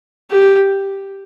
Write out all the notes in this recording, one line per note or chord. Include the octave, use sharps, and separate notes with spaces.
G4